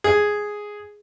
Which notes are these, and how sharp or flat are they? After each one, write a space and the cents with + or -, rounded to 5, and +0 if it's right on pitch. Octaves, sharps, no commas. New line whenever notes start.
G#4 +0